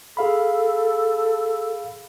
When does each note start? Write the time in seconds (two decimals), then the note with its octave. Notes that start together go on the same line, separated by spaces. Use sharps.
0.17 G#4 A4 F5 B5